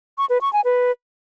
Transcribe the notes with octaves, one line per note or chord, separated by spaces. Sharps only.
C#6
B4
C#6
G#5
B4